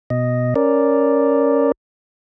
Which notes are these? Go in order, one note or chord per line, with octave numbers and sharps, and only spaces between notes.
B2 D#5
C#4 A#4 D5